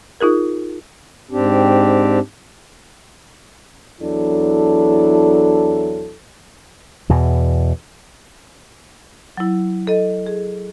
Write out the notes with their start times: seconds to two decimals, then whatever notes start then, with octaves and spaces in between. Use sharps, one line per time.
0.21 D#4 F4 G#4 A#4
1.31 G#2 C4 D4 G4
4.01 E2 F#3 D4 E4 A4
7.09 E2 B2 E3
9.37 F#3 E4
9.87 A4 D#5
10.27 G#4